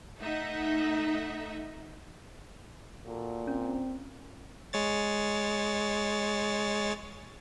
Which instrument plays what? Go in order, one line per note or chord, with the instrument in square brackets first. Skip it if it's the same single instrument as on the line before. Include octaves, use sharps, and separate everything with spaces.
[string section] A3 D#4 E5 F#5
[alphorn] A#2 [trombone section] A#3 F#4 A4
[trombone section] C4 [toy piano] C#4
[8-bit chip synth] G#3 C#5 A6